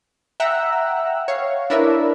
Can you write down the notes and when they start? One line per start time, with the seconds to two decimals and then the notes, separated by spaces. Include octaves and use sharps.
0.40 E5 F#5 G5 A#5 E6 F#6
1.28 C#5 F5
1.70 D4 E4 A#4 B4 E5